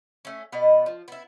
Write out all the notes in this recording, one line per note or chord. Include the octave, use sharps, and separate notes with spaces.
A3 C#4
B2 B3 D5 D#5
F3
B3 E4